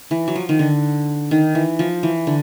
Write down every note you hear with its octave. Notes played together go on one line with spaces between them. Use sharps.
E3
F#3
F3
D#3
D3
D#3
E3
F3
E3
D3